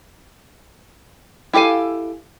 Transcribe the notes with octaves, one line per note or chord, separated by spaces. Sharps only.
E4 G4 A4 F5 G#5